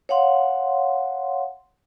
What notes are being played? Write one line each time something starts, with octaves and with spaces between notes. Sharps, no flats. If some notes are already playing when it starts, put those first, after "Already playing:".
C#5 F5 F#5 C6